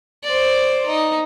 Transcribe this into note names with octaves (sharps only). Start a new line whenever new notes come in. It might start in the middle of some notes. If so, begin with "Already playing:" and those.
C5 D5
D#4